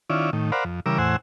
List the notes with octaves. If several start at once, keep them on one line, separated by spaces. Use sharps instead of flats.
D#3 C#4 E4 F4 D5
A2 D#3
A#4 C5 D5 F5 F#5 B5
F2
C#3 E3 G3 A#4 D6 E6
E2 A2 C5 F#5 G#5 E6